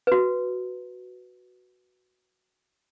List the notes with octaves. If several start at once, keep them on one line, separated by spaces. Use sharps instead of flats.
F#4 B4